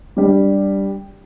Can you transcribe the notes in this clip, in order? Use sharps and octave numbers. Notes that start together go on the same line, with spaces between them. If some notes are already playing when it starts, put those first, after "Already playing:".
G3 D4 G4